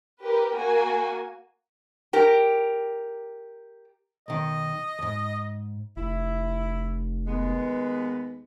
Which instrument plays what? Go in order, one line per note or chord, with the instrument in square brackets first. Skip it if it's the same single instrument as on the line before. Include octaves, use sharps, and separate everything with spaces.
[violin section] G4 A#4 B4
A#3 F#4 G#5
[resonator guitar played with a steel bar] G4 A#4
[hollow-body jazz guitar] B1 D#3 [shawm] D#5
[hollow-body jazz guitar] D#2 G#2
[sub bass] F1 [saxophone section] E4
[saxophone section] D#2 G#3 B3